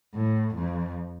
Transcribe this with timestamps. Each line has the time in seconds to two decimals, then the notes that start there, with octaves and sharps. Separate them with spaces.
0.15 A2
0.55 F2